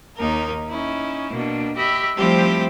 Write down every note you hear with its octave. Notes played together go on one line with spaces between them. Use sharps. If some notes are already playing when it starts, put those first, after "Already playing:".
D#2 A#3 D#4 A#4
C#4 D#4 E4
B2 A#3 D4
G4 D#5 E5 B5
F3 G3 A3 C4 E4 G4